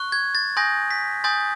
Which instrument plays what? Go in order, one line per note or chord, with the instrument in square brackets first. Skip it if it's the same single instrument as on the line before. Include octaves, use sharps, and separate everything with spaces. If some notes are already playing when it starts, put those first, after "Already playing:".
Already playing: [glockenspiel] C#6 F#6
G#6
A6
G#5 C6 D#6 G6 A#6
B6
G#5 C6 D#6 G6 A6